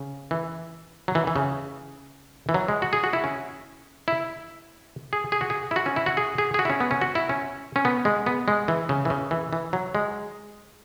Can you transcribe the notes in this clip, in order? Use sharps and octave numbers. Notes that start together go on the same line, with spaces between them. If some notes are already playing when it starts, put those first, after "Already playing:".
Already playing: C#3
E3
F#3
E3
E3
C#3
E3
F#3
G#3
F#4
G#4
F#4
E4
C#4
E4
G#4
G#4
F#4
G#4
E4
F#4
C#4
E4
F#4
G#4
G#4
G#4
F#4
E4
C#4
B3
C#4
F#4
E4
C#4
C#4
B3
G#3
B3
G#3
E3
C#3
E3
C#3
E3
E3
F#3
G#3